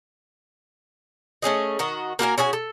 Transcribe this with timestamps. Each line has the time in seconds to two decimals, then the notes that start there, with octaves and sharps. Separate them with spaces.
1.42 A3 C#4 G#4 D#5
1.79 D#3 F#4 D#5
2.19 A#3 F#4 A#4 G#5
2.38 C#4 F#4 G#4 G#5
2.53 A4